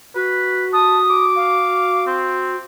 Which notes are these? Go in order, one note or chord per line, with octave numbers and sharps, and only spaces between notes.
F#4 B4
A5 D#6
D6
F5
C4